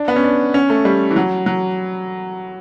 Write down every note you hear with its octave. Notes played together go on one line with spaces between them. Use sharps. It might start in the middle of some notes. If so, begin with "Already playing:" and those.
Already playing: D4
B3
C#4
D4
C#4
A3
G3
E3
F#3
F#3